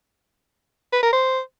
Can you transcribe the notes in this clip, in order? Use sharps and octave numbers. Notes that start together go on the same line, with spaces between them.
B4
A#4
C5